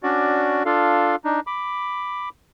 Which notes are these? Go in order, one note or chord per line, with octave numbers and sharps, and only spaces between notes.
C#4 D4 F#4 D5
D4 F4 A4 F5
D4 D#4
B5 D6